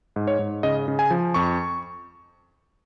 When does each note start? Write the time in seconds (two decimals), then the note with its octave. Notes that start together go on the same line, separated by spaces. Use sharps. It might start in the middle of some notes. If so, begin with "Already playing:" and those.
0.16 G#2
0.27 C#5
0.39 G#2
0.63 C#3 D#5
0.88 C#3
0.99 G#5
1.11 F3
1.34 F2 C#6